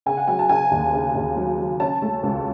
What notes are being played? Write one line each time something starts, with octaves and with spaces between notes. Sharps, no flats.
C#3 G#5
F#5
F#3 G#5
A5
C#3 G#5
D#2
C#3
D#2
F#3
F#3
C#4 A5
A3
C#2